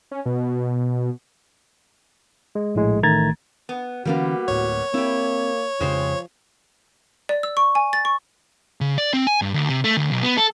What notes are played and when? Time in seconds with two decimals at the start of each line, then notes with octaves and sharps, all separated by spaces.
0.11 C#4
0.26 B2
2.55 G#3
2.75 A#1 A2 G#3
3.03 A1 D#3 A3 A#5 G#6 A6
3.69 B3
4.05 D3 E3 G3 A#3 B3 C#4 F#4
4.48 D1 A2 C#5
4.94 A#3 C4 E4 G4
5.80 F2 C#3 F3 G#3 G4 C5
7.29 D5
7.43 E6
7.57 C#6
7.75 G#5
7.93 A6
8.05 C#6
8.81 C#3
8.98 D5
9.13 C4
9.27 G#5
9.42 G2
9.54 D2
9.69 C3
9.84 A3
9.97 D2
10.11 B1
10.23 B3
10.37 A4